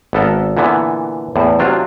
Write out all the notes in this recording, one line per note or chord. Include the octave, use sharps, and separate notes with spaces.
G#1 B3 A4 A#4
A#2 D3 E3 B3
E2 A2
C3 F#3 D4 F4